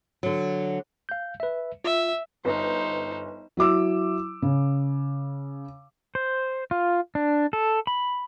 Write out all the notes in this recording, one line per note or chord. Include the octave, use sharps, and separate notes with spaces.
D3 F#3
F5 G6
B4 E5
F4 E5
G1 D#4 B4 C5
F#3 E4 D6 E6
C#3
C5
F4
D4
A4
B5